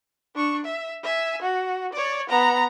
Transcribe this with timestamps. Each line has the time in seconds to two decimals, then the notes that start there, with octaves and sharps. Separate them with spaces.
0.35 D4 C#6
0.65 E5
1.03 E5 G#5
1.42 F#4
1.93 C#5 D5
2.29 B3 A#5